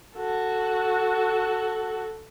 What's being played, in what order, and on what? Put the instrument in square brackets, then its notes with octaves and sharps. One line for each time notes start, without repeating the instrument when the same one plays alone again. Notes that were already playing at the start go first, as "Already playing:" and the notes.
[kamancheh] F#4 A4